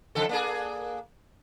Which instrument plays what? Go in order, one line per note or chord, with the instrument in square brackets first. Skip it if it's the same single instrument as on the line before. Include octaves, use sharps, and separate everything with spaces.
[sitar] F2 C#3 A4
A#3 D4 G#4